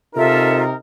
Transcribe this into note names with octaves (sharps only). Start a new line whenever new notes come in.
C3 D#4 F4 A4 A#4 E5